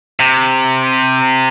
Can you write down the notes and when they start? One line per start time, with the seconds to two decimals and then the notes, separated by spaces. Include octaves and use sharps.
0.20 C3